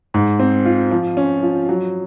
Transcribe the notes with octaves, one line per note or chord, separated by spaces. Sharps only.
G#2
C4
F4
F3
C#4
F3
F#3